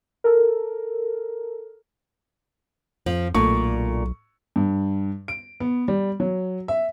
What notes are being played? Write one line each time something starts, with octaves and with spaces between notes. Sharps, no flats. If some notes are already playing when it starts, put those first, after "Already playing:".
A4 A#4
F2 F3
B1 A#2 A3 D4 C#6
G2
D7
B3
G3
F#3
E5